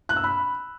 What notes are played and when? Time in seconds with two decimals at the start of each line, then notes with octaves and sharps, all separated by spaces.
0.09 F#6
0.17 E6
0.24 B5